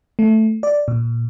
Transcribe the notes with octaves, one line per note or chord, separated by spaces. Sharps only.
A3
D5
A#2